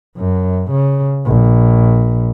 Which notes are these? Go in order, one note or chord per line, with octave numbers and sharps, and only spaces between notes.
F#2
C#3
A#1